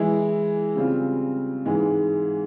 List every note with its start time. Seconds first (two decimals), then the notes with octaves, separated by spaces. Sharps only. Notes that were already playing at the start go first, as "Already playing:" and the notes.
Already playing: E3 G#3 E4
0.76 C#3 G3 C4 F4
1.66 G#2 E3 G#3